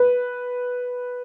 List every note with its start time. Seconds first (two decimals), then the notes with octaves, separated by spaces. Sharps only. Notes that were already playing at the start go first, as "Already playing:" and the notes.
Already playing: B4